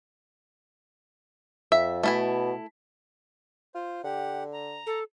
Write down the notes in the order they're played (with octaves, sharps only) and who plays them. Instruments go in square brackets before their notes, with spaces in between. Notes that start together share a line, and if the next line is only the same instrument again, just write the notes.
[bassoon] F2 [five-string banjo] E5
[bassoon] B2 [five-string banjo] A3 E4 G#5
[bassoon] F4 [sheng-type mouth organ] C5
[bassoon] D3 [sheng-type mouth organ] G4 F#5
[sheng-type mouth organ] A#5
[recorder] A4